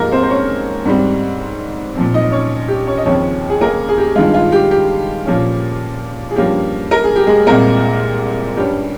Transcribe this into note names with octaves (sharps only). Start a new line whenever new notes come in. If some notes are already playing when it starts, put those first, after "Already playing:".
Already playing: G#2 F3 G#3 A#3 G4 A#4
C4 C5
C5
C#4 C#5
G#2 G3 C4
A#2 F3 C4
D#4 D#5
C#4 C#5
G4
C#4 C#5
D#5
D#2 C#3 F3 C4 C#4 C#5
G#4
A#3 A#4
G#4
G4
G2 D#3 G#3 F4
F4
G4
G4
A#2 F3 A#3 C#4
G#4
G2 F3 A#3 C#4 G4
A#4
G#4
G4
G#3 G#4
C2 A#2 G#3 A#3 C4 A#4
G2 G3 C#4 G4